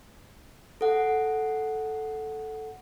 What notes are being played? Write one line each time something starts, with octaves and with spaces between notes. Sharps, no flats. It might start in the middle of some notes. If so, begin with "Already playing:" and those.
A4 F#5